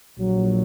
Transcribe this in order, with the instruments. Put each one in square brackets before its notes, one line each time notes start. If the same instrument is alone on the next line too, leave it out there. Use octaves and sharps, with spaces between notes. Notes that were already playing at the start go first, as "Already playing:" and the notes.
[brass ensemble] A#1 A#2 F#3